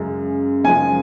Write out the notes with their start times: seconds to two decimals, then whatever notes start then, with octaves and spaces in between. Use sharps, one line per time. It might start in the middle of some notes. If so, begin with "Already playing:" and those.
Already playing: F#2 C#3 G#3
0.64 F#2 C#3 F3 G#3 G#5